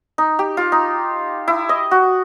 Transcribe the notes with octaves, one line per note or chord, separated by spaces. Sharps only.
D#4
G4
F4
D#4
E4
D#5
F#4